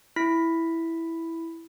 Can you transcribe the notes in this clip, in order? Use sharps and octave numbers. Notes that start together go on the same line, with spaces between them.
E4 B6